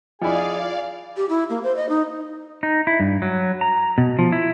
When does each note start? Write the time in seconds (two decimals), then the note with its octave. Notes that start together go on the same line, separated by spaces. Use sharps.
0.22 F2 E4 F4 G#4 D5 D#5 F5 G#5
1.17 G4
1.29 E4
1.50 A#3
1.63 C5
1.76 D#5
1.89 D#4
2.63 D#4
2.87 E4
3.00 G2
3.22 F#3
3.61 A#5
3.98 B2
4.19 F3
4.32 E4